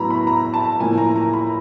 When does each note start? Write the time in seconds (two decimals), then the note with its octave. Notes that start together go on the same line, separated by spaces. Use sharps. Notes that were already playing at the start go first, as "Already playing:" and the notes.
Already playing: A2 F#3 B3 A#5 B5
0.10 B5
0.27 A#5
0.54 A5
0.80 A2 F3 A#3 G#5
0.98 A#5
1.16 A#5
1.33 B5